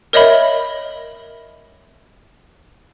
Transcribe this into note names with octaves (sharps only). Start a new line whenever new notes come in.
A#4 C#5 D#5 E5 B5